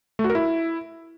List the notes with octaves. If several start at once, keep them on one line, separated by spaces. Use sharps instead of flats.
A3
F#4
A#4
E4